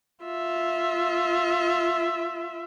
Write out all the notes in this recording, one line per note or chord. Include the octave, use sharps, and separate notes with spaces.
F4 E5